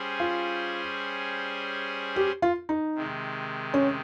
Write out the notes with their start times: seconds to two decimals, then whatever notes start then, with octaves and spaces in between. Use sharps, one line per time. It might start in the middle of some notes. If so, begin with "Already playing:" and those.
Already playing: G3 C#4 G#4 C5
0.20 F4
2.16 G4
2.42 F4
2.69 D#4
2.95 C3 D#3 G#3
3.74 C#4